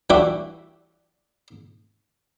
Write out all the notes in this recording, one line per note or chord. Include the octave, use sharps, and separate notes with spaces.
E3 G3 D4 F#4 G4 E5